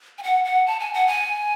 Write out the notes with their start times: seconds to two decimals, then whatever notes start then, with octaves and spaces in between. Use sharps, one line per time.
0.18 G#5
0.23 F#5
0.45 F#5
0.66 A5
0.80 G#5
0.94 F#5
1.07 G#5